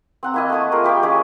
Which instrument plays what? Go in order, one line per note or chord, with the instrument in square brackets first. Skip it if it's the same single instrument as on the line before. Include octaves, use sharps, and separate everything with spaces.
[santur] C4 F#5 A#5
A#3 E4 D#5
A3 A5 C#6 D#6
A#3 F4 G#4 A#4
G3 G4 D5 F5
G#3 C#4 E4 G#4